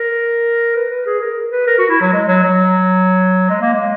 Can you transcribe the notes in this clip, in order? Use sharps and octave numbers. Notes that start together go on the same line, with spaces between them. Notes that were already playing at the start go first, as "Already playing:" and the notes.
Already playing: A#4
B4
B4
G#4
A#4
B4
A#4
F#4
E4
F#3
G#3
F#3
F#3
G#3
A#3
G#3